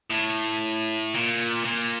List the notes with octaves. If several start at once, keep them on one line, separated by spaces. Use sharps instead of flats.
A2
A#2
A#2